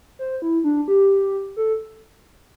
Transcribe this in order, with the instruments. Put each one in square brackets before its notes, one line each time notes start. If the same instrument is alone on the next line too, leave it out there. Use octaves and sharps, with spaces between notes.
[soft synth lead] C5
E4
D4
G4
A4